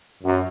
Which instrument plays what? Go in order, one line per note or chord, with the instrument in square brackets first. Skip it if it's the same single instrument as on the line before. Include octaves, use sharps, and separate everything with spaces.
[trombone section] F#2